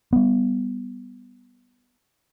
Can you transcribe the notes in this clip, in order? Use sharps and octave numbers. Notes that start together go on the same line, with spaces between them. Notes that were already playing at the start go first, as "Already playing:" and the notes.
G3 B3